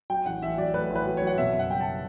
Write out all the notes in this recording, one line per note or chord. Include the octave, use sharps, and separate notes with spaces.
F#3 G5
A1 F#5
A1 E5
F#3 D5
A3 B4
A1
B4
F#3
F#3 C#5
F#5
B2 E5
F#1
F#5
G3 G5
A5